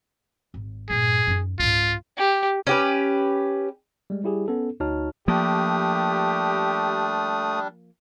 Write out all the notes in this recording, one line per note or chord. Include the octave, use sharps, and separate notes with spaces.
G#1
G2 A#2 G#4
F#2 D#4
C#2 G#2 F4
G4
C#4 G4 B4
G3 G#3
G3 E4 G4 G#4
B3 C#4 A4
D2 D#4 F#4 C#5 A5 F6
F3 G3 A3 A#3 D4 G4 D#6